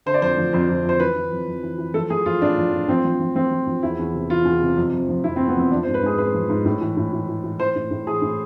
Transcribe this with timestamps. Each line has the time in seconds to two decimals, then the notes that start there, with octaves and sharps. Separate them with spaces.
0.06 D3 C5
0.14 D5
0.22 F2 C5
0.37 F3
0.53 F2 C5
0.69 F2
0.84 F2 C5
1.00 E3 B4
1.16 E3
1.32 F2
1.47 F2
1.63 E3
1.78 E3
1.94 F3 A4
2.10 F3 G#4
2.26 F3 F4
2.42 A2 D4
2.57 F3
2.73 F3
2.88 F3 C4
3.05 F3
3.20 F3
3.35 F3 C4
3.51 F3
3.67 F3
3.83 E2 E4
3.99 E2
4.14 C3
4.30 E3 F4
4.45 E2
4.61 C3
4.77 F2
4.93 F2
5.09 F3
5.24 F2 E4
5.36 C4
5.40 F3
5.48 B3
5.56 F2 C4
5.71 F3 D4
5.83 C5
5.87 G#2
5.94 B4
6.03 G#2 G#4
6.18 G#2 B4
6.34 F3
6.50 G#2
6.65 A2
6.81 E3
6.97 A2
7.13 E3
7.28 E3
7.44 E3
7.60 E3 C5
7.76 A2
7.91 A2
8.07 E3 G#4
8.22 A2